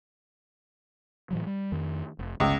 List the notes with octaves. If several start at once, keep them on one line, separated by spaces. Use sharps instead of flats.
A2 E3 F#3
G3
F2 D#3
F1
G1 C#2